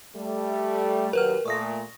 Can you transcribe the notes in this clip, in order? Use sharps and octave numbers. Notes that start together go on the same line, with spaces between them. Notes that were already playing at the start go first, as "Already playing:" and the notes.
G3 A3
D#2 F#3 G4 A#4 B4 F6
A#2 A3 C#6 D#6 A#6